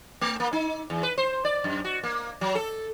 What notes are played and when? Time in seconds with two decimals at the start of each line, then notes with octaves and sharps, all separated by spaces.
0.21 A3
0.40 A#3
0.53 D#4
0.90 E2
1.03 B4
1.18 C5
1.45 D5
1.64 F#2
1.84 F#4
2.03 A#3
2.41 F#3
2.55 A4